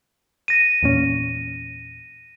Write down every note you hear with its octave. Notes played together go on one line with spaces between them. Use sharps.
A#6 D#7
E2 A#2 C#4